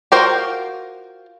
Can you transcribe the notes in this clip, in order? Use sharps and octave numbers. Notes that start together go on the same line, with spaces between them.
F4 F#4 A#4 C5 G5